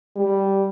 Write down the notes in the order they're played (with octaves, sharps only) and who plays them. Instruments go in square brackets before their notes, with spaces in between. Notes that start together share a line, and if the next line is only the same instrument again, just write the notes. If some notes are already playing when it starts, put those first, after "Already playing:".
[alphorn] G3